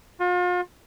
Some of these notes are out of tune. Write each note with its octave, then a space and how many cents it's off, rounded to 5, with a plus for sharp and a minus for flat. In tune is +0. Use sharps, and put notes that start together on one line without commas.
F4 +40